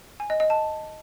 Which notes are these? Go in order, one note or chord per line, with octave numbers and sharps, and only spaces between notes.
G#5
D#5
D#5
A5